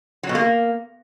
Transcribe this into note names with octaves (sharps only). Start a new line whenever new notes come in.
F#3
B2
A#3